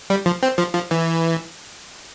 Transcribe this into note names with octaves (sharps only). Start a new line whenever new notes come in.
G3
F3
C4
F3
F3
E3